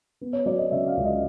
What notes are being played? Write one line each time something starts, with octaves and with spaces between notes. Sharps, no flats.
B3
C#5
F#3 D5
D#5
C#3 E5
F5
C#2
D#5